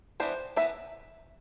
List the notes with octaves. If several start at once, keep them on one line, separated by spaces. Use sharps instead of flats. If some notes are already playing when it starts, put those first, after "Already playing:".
E3 G3 B3 D4 C5
E3 B3 D4 E5